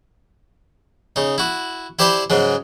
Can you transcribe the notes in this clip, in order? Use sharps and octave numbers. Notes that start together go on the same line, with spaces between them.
C#3 D#4
E4 F#4
E4 G4 C5 D5 A5 B5
G#2 C#3 F#3 G#3